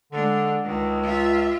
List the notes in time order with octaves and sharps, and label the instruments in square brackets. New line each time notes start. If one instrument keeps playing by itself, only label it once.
[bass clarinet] D3 [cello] G#3 D4
[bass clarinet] C#2 [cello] D#3
[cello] F4 E5